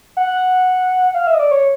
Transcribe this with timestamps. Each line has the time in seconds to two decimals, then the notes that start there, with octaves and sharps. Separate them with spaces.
0.17 F#5
1.15 F5
1.27 E5
1.34 D#5
1.39 D5
1.51 C#5